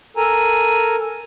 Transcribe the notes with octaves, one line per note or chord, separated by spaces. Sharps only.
A4 A#4 G#5 A#5